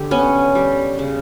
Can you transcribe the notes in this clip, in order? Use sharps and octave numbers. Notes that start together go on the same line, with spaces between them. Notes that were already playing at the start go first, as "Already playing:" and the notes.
Already playing: D3 G4
B3 C#4
G3
C#3